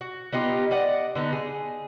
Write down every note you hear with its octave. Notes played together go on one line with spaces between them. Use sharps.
F#4
B3 D#4 F4 G4
D5 D#5 F#5
D3 B3 D#4
G#4